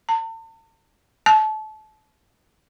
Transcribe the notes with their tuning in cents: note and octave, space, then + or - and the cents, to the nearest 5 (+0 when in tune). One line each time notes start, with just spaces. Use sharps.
A5 +40
A5 -30